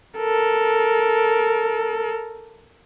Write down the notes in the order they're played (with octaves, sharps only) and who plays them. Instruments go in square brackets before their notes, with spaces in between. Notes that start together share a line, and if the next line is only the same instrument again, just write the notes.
[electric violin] A4 A#4